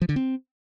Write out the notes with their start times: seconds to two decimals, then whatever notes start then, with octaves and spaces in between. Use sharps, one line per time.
0.02 F3
0.09 D3
0.16 C4